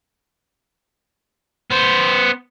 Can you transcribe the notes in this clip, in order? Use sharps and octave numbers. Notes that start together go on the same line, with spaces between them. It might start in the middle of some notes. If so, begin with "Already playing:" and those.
B3 C5